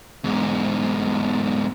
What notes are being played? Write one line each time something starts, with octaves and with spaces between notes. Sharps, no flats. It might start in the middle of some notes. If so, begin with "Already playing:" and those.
E2 G#2